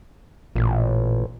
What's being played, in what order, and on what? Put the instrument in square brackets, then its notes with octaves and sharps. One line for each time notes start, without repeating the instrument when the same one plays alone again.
[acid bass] A1 [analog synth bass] A#2